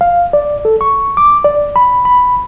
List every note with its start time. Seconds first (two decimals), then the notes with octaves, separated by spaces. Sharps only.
0.01 F5
0.33 D5
0.65 A4
0.81 C#6
1.17 D6
1.44 D5
1.76 B5
2.05 B5